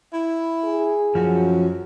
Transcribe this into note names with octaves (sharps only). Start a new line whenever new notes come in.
E4
G#4
F#2 F3 C#4 F#4